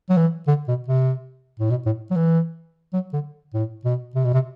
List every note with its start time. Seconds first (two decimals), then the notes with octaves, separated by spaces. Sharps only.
0.09 F#3
0.17 E3
0.47 D3
0.68 B2
0.88 C3
1.59 A2
1.70 B2
1.86 A2
2.11 F#3
2.16 E3
2.93 F#3
3.13 D3
3.54 A2
3.85 B2
4.15 C3
4.24 B2
4.34 C3